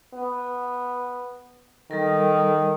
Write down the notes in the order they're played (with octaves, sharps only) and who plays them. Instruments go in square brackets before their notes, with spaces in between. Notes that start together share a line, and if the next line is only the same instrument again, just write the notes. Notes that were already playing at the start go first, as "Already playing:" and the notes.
[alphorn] B3
[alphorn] D#3 [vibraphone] G3 A4 A#4